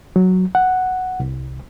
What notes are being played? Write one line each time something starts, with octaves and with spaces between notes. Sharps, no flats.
F#3
F#5
C2